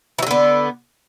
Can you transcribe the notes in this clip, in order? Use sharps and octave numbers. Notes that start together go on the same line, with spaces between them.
D3 E3 F#3 B3